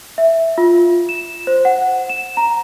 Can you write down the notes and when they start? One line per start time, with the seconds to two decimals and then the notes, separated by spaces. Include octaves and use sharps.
0.18 E5
0.58 F4
1.09 E7
1.47 C5
1.65 F#5
2.09 E7
2.37 A#5